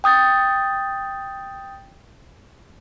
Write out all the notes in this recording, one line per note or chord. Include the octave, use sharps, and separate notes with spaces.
G5 D#6 G6 A6